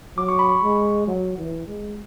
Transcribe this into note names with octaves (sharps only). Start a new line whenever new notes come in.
F#3 D6
C#6
B5
C#6
G#3
F#3
E3
G#3